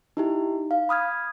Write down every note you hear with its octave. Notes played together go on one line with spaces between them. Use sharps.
D#4 E4 G4
F5
B5 D#6 F6 G#6